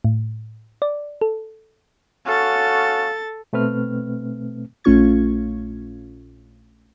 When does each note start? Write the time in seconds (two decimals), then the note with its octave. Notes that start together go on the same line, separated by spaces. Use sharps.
0.04 A2
0.82 D5
1.21 A4
2.27 C#4 F#4 A4 F5 A6
3.53 B2 A3 C4 B4 F6
4.84 A#1 A3 C#4 F4 C#6 G#6